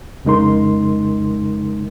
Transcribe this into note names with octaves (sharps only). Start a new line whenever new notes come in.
F2 C#3 G#3 D#4 A#4 C6